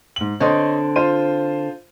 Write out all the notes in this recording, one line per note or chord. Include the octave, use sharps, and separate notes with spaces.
G#2 F#7
D3 C4 C#5 D#5 C6
F4 C5 D#7